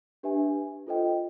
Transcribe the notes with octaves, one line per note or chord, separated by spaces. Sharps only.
D4 G4 B4 E5 G#5
F4 A4 C5 D#5 G5